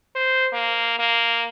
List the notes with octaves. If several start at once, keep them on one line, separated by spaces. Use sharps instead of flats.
C5
A#3
A#3